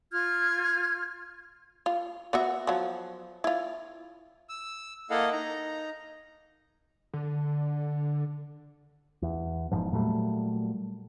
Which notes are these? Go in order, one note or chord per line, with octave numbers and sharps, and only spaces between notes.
F4 F6 G#6
F4
B3 F#4 E5
F3 F#3
E4 F4
E6
A#3 E4 A4 D#5 F5 F#5
D#4 A#5
D3
E2
E1 E2 G#2 F3
A#2 F#3 G3 A3